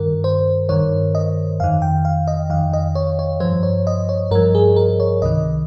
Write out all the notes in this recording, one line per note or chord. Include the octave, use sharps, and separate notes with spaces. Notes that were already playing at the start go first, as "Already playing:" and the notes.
Already playing: G2 D#3 A#4
C5
G2 D#3 C#5
D#5
F2 D#3 F5
G5
F5
D#5
F2 D#3 F5
D#5
C#5
C#5
G2 F3 C5
C#5
D#5
C#5
G2 F3 A#4
G#4
A#4
C#5
C2 C3 D#3 D#5